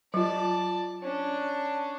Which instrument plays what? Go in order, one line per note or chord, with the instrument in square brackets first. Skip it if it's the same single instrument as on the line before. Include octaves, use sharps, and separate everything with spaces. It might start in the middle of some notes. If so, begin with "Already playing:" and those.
[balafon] F#3 F4 [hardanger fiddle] D5 A5
[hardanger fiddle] C#4 D4